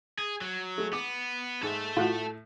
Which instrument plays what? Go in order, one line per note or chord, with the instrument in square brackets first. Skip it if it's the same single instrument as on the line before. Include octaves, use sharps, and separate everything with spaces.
[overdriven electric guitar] G#4
F#3
[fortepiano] G#3 A3
[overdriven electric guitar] B3 [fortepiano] D6
[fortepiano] G#2 [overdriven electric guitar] A4 E5
[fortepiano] A2 [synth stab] F4 F#4